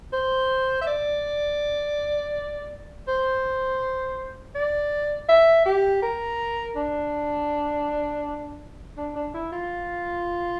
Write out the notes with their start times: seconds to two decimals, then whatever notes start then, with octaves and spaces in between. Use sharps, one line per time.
0.13 C5
0.81 E5
0.87 D5
3.08 C5
4.55 D5
5.29 E5
5.65 G4
6.02 A#4
6.76 D4
8.97 D4
9.16 D4
9.34 E4
9.52 F4